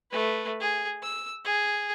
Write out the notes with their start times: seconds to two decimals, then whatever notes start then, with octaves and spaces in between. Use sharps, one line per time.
0.11 A3 B4
0.60 G#4
1.03 E6
1.45 G#4